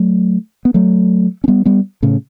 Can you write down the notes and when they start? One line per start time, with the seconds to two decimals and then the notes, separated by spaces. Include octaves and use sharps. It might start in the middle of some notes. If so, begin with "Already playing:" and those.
Already playing: F#3 A3
0.65 B3
0.74 F#3 A3
1.44 C#4
1.48 G3 B3
1.65 G3 B3
2.02 A2 C#3